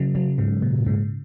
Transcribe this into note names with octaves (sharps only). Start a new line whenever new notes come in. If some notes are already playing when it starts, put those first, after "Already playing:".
Already playing: C#3 F#3
C#3 F#3
G#2 C#3
A#2
G#2 C#3